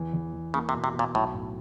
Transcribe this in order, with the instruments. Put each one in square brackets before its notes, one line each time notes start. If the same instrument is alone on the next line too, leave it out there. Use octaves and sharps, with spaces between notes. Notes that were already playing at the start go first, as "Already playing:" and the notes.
Already playing: [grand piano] E2 E3
E2
E2
[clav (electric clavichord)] C#3 [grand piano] A#3
[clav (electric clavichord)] C3
[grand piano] B2
[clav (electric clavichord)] C3
[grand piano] B2
[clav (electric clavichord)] A#2
[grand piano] B1 [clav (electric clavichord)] A2
[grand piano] A2